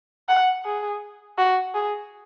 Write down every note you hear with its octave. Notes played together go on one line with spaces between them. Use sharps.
F#5
G#4
F#4
G#4